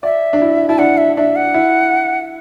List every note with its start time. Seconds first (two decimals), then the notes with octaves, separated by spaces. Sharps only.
0.03 D5 E5
0.33 D4
0.42 E4
0.68 E4 A5
0.78 D4 F#5
0.98 E5
1.17 D4 E5
1.36 F#5
1.54 E4